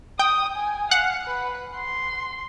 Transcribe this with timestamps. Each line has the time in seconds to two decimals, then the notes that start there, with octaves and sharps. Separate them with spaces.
0.19 G5 D#6
0.57 G#5
0.91 F5 F#5
1.27 B4
1.76 C6